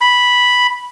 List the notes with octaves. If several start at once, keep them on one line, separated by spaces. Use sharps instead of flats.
B5